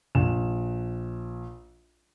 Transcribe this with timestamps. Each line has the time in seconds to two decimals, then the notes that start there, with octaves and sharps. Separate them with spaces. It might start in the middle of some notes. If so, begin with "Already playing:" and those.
0.15 A#1 E7